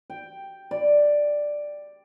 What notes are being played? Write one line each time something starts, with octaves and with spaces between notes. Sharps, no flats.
G5
D5